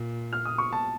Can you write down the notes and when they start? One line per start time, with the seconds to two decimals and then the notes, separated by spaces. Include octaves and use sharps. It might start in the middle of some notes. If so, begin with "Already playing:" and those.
Already playing: A#2
0.33 F6
0.45 D#6
0.58 C#6
0.73 A5